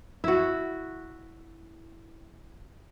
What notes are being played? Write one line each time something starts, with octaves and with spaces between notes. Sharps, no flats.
E4 F#4